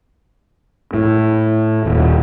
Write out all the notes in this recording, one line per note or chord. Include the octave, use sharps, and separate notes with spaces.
A2
D#1